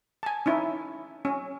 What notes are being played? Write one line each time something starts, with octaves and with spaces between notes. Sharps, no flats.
G#5 A5
C#4 D#4 E4
C#4